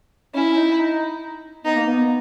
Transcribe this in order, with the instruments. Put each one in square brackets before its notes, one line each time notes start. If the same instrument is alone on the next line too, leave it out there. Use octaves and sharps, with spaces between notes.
[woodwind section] C#4 [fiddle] E4
[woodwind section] D#4
D#4
[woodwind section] B3 [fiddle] D#4
[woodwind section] A#3
B3